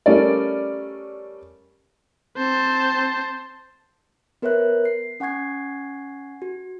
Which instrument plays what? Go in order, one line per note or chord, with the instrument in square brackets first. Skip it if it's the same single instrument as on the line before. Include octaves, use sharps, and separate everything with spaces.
[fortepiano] G3 A3 C#4 A#4 D5
[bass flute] C4 [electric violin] C5 A5
[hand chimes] B3 A#4 B4 C#5 E5 F#6
C7
C#4 F#5 G#5 C#6 G#6 C7
F#4